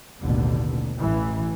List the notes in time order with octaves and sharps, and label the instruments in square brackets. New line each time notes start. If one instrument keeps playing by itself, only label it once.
[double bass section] A1 D#2 B2 D3
A1 E3